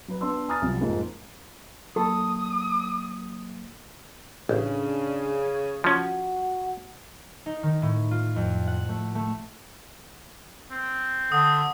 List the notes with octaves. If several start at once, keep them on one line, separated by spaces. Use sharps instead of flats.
F#3 B4
B3 D4 C6 E6
G#5 A#5 D#6 F6 A6
C2 C3 F3 F#3 G4
F2 G#2 A#3
F#3 A#3 A4 D#6
A1 C#3 D4
F3 C#4 F#4
D#4
D#3
A2
F4
F2
F#5
A3
A3
C4
D3 D#6